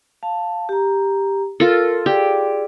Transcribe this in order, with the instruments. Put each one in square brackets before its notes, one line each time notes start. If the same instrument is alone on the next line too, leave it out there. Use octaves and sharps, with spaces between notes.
[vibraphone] F5 A5
G4 A#5
[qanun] F4 A4 [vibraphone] A#4
[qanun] G4 [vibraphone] G#4 D5